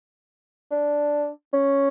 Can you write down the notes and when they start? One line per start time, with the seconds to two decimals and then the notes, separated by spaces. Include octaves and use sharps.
0.71 D4
1.53 C#4